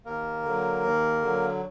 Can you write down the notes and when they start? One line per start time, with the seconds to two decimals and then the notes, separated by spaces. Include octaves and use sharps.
0.05 D#2 A#3 A#4
0.45 D3 F#3
0.84 D#2
1.22 D3 F#3